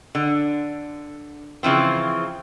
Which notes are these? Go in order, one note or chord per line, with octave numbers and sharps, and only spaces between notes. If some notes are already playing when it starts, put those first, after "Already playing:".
D3
C#3 E3 F3 C4